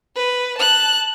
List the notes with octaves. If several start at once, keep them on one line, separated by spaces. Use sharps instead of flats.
B4
A5 F#6